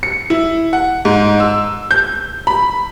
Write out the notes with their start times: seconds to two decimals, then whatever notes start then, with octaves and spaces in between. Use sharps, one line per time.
0.03 C#7
0.30 E4
0.73 F#5
1.05 G#2
1.40 E6
1.91 G6
2.47 B5